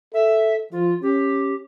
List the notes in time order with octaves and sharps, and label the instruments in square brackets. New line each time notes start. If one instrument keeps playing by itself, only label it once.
[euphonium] A4 [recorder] E5
[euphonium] F3 [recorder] F4
[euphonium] C#4 [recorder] G4